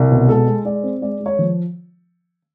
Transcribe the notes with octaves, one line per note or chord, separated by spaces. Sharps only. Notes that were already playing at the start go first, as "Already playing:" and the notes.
Already playing: C2
B2
G#3 A4
G#3
G#3 D5
C4
G#3 D5
G#3
C#5
F3